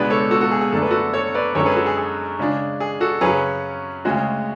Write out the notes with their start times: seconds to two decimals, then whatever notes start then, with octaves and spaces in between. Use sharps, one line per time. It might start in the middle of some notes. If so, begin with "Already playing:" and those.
Already playing: C#2 B2 G#3 B3 D4 B4 D5
0.10 A4 C#5
0.31 F#4 A4
0.41 F#4 A4
0.51 G#4
0.61 G#4
0.72 F#2 D3 A3 D4 A4
0.82 B4
0.91 F#4 A4
1.14 A4 C#5
1.35 B4 D5
1.55 F#2 D3 G#3 C#4 A4 C#5
1.66 G#4 B4
1.76 F#4 A4
1.86 G#4
1.97 G#4
2.39 C#3 G#3 D4
2.80 G#4
3.01 F#4 A4
3.21 F#2 C#3 F#3 C#4 G#4 B4
4.05 D2 C#3 G#3 F#4